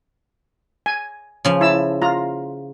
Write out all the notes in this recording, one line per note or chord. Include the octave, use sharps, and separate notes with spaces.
G#5
C#3 F3
E4 A5 E6
F4 A#5